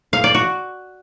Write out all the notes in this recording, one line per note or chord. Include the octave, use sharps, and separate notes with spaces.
F5
D5
F#4